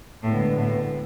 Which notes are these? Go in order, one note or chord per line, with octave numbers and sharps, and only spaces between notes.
D2 A2 D3 G#3 B3
A2